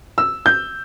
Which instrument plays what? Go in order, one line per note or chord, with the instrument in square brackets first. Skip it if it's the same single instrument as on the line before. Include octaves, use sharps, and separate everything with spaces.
[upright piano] E6
G6